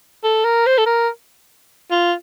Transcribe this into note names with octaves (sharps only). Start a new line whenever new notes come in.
A4
A#4
C5
A4
A#4
F4